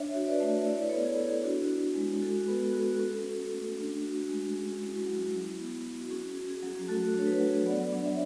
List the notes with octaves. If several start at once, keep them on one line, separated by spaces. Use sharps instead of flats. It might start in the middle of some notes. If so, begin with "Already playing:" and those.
Already playing: D4 C#5 E5
F#4
B4 D5
A3
E4 D5
C#5
B4
A4 C#5
B3
G#4
E4
D4 F#4
F#4
G#3
F#4 A4
B3 G#4 B4
F#4 A4
C#4
F#4
A3
D4
F#4
G#3
C#4 G#4
E4
F#4
F#3
E4
B3
E4
F#4
C#4 G#4
F#4
G#4
F#3
A3 F#4 A4
D4 C#5
G#4 B4
F#3
B3 D5 F#5
D4
C#5 E5